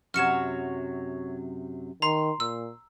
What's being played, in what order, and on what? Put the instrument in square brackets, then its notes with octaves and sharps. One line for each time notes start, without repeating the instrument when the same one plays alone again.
[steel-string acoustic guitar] F#2 C3 F#3 [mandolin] F#4 C#5 [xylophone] F6 C#7 E7
[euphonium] D#3 [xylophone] A#5 [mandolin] C6
[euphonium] A#2 [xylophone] E6